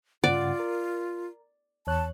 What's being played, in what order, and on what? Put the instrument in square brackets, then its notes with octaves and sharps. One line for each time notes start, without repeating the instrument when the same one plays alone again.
[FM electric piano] G2 C#3 F#5 [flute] F4 [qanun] D5
[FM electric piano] A#4
[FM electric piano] E2 C#5 F#6 [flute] A5